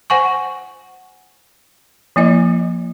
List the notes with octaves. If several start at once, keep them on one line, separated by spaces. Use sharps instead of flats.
C5 F#5 G#5 C#6
F3 A#3 E4 D#5